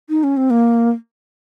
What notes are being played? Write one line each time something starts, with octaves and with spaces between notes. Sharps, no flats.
D#4
C#4
C4
A#3